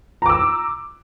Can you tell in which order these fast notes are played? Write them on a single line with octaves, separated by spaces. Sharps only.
A#5 D6 E6